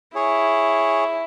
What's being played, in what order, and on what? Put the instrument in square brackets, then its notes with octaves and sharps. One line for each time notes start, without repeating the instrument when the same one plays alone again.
[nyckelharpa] E4 [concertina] G#4 C#5